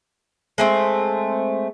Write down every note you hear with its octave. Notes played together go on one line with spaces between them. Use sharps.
G#3 A3 C4